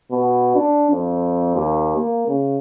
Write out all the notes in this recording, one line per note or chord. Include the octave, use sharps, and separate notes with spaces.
B2
D4
F2
D#2
A#3
C#3